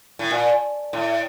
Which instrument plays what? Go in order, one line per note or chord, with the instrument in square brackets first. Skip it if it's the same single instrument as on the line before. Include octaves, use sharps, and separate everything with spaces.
[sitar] A2
A#2
A2